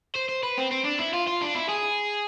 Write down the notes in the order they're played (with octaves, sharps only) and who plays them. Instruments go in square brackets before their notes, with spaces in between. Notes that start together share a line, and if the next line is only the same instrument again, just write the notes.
[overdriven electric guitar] C5
C5
B4
C4
C4
D4
E4
F4
F4
D4
E4
G#4